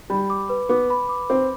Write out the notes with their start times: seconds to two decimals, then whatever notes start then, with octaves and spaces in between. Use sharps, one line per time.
0.10 G3 B5
0.30 D6
0.49 B4
0.69 B3 D6
0.90 B5
1.09 D6
1.29 C4 D6